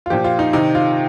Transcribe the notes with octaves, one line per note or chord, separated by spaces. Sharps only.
F4
A#2 F3 G4
F4
D#4
C3 D#3 D#4
F4